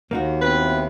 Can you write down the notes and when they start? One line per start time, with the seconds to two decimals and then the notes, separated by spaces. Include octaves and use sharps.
0.11 D#2 A#3 D#4 F#4
0.41 B3 C4 E4 B4